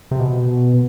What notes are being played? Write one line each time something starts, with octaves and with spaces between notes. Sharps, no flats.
C3
B2